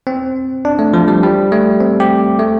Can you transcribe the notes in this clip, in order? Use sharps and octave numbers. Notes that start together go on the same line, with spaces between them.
C4
D4
A3
F3
G3
G3
A3
C4
G4
A3